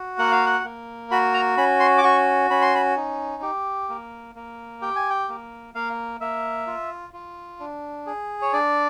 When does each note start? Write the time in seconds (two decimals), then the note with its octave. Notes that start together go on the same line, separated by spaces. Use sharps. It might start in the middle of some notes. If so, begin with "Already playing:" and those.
Already playing: F#4
0.19 A#3 F#5
0.32 F5
0.46 F#5
0.64 A#3
1.11 F#4 B5
1.34 A#5
1.57 C#4 B5
1.80 C6
1.98 D6
2.03 F#4 C#6
2.50 C#4 B5
2.62 C6
2.75 B5
2.97 D#4
3.42 G4
3.89 A#3
4.35 A#3
4.82 G4 G5
4.96 G#5
5.10 G5
5.29 A#3
5.74 A#3 F5
6.21 A#3 E5
6.67 F4
7.13 F4
7.60 D4
8.07 G#4
8.42 C#5
8.53 D4 D5